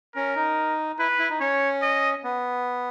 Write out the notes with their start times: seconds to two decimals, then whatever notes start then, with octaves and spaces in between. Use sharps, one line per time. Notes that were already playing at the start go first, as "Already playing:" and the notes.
0.15 C#4 A#4
0.36 D#4
0.99 E4 B4
1.19 E4
1.30 D#4
1.40 C#4 C#5
1.82 D#5
2.24 B3